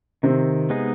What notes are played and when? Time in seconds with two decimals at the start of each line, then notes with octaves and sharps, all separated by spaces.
0.23 C3 D#3 C4
0.70 G#3 B3 D#4 G#4